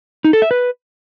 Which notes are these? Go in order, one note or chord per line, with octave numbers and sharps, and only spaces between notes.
D#4
A4
E5
B4